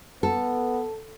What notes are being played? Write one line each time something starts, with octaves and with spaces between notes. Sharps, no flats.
B3 A4